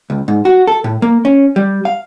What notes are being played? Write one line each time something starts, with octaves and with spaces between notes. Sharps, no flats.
C#2
G#2
F#4
A4
A2
A#3
C#4
G3
F5